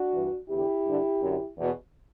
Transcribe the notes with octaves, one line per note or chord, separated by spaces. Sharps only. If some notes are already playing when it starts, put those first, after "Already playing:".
Already playing: D4 F#4
G2 E3
E2 D3 E4 G4
G2 D3
F#2 D3
E2 B2